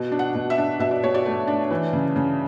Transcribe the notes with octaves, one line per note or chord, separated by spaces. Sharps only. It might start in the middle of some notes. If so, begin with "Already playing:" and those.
Already playing: B2
D4
F#5
B2
E5
D4
B2 E5
D5
B2 C#5
D5
A3
D4
E3
C#3
C#3